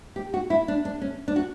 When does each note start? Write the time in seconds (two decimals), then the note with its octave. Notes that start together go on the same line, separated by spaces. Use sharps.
0.16 G4
0.34 F#4
0.50 E4
0.68 D4
0.85 D4
1.02 C#4
1.28 D4
1.36 F#4